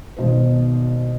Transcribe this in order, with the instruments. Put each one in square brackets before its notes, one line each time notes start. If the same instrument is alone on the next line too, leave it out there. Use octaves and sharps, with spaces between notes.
[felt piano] G#1 B2 C5